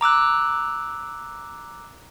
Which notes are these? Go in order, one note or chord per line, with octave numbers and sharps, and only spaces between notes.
A#5 D6 E6 F#6